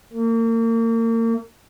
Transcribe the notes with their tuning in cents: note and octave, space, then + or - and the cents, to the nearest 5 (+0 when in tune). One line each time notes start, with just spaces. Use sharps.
A#3 -35